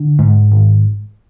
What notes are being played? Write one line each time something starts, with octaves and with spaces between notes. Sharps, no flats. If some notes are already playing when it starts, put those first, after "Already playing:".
Already playing: D3
G#2
G#1